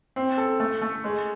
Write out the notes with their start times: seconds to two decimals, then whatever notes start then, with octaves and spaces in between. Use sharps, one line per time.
0.16 C4
0.38 A4
0.60 A3
0.82 A3
1.04 G#3